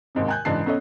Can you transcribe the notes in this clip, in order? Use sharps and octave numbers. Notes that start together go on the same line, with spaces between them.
D#2 G#2 C3
G#5 F#6 G6
F#1 G#2 E3 D4 A5 C7
B3 C#4 A4 C#5 D#5